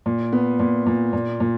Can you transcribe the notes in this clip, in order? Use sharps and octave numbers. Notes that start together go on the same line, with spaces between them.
A#2
B3
A#2
A#2
A#2
A#2